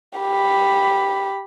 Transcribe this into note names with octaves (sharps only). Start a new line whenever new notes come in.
G4 B5